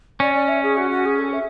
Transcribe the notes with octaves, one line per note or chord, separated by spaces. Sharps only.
C#4 D5
D5
E5
G#4
F#4
F#4
G#4
A4
E5